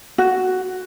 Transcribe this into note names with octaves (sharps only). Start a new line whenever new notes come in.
F#4